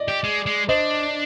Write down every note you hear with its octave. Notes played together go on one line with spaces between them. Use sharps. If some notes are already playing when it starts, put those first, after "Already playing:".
Already playing: D5 D#5
G4
G#3
G#3
D4 C5 D#5